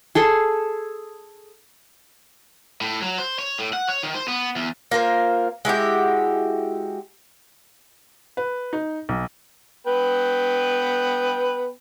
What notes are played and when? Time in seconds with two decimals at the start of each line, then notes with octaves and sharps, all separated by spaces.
0.15 G#4 A4 C6
2.81 A2
3.02 F#3
3.18 C5
3.39 C#5
3.59 A2
3.73 F#5
3.88 C#5
4.03 D#3
4.14 C5
4.28 B3
4.56 E2
4.91 A#3 F4 A#4 C5
5.65 G#3 E4 F#4 G4
8.37 B4
8.73 D#4
9.09 B1
9.87 B3 B4 G5